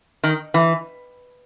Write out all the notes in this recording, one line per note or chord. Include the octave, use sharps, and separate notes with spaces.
D#3
E3